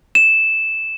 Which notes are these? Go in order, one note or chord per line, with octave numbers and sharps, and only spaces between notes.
E7